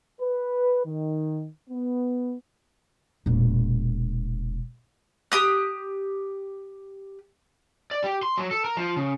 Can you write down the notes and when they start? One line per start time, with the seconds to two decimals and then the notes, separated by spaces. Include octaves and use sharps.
0.21 B4
0.86 D#3
1.69 B3
3.26 E1 A#2
5.32 G4 D#6 F#6
7.91 D5
8.04 G4
8.23 C6
8.38 F#3
8.51 A4
8.65 A#4
8.77 F3
8.96 C#3